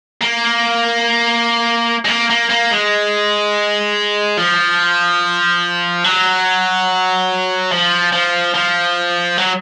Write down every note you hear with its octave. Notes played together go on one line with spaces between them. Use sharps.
A#3
G#3
A#3
A#3
A#3
G#3
F3
F#3
F3
F3
F3
F#3